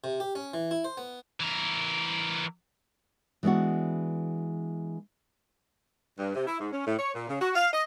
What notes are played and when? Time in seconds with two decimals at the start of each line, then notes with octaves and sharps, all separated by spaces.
0.04 C3
0.20 G4
0.35 C#4
0.54 E3
0.71 E4
0.84 C5
0.97 B3
1.40 E3 A#4
3.43 E3 G#3 B3 D4 F#4
6.18 G2
6.35 C3
6.47 E4
6.59 G#2
6.72 C#4
6.86 A2
6.98 C#5
7.14 A#2
7.28 C#3
7.40 F#4
7.55 F5
7.73 D#5